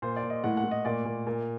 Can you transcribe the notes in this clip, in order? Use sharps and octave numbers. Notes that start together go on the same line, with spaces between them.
A#2 C5
D5
A#2
D#5
A2 F#5
F#5
A2
D#5
A#2 D5
A#2
A#2